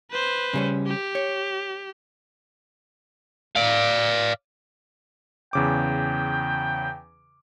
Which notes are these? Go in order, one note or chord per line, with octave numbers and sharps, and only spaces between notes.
B4 C5
C#3 G3 C#4
G4
C#5
D5 F5
E2 C#3 G5 D6